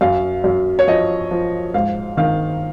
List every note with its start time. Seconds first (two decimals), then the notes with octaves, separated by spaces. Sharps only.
0.01 F#2 F5
0.44 F#2
0.79 C#5
0.87 F3 D#5
1.31 F3
1.74 G#2 F5
2.17 D#3 F5